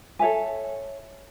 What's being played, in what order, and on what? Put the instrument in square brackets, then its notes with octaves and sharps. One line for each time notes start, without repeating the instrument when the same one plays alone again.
[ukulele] A4 C#5 E5 G#5